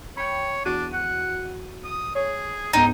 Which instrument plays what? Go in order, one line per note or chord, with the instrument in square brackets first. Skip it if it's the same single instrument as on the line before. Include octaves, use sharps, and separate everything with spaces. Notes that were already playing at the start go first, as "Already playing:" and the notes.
[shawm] C#5 [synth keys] G5 B5
[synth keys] E2 F#4 D#7 [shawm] D4
[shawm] F#5
D#6
[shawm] G#4 [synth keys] C#5
[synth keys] C#2 G#2 B3 [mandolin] D#4 [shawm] G5